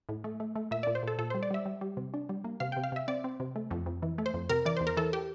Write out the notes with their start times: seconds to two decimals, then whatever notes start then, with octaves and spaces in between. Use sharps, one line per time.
0.09 A2
0.24 A3
0.40 A3
0.56 A3
0.71 A#2 E5
0.83 A#2 D5
0.95 C5
1.03 A#2 A4
1.19 A#2 A4
1.30 G3 C5
1.43 D5
1.51 G3 E5
1.66 G3
1.81 G3
1.97 C3
2.14 D4
2.29 G3
2.44 A#3
2.60 C3 F5
2.72 C3 G5
2.84 F5
2.92 C3 E5
3.08 C4 D5
3.24 C4
3.40 C3
3.56 A3
3.71 F2
3.86 F2
4.02 E3
4.18 A3
4.26 C5
4.34 F2
4.49 C3 A#4
4.66 E3 D5
4.77 E2 C5
4.87 A#4
4.97 E3 A4
5.13 G4